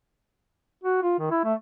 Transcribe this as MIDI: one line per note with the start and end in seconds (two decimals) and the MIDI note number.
0.84 0.98 66
1.03 1.17 65
1.19 1.30 51
1.31 1.44 64
1.44 1.54 57